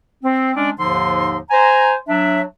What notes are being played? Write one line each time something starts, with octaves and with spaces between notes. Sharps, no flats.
C4
G#3 C#4 D4
D#2 G#2 D3 F3 D#4 C6
C5 G#5 A#5
F#3 D4 E5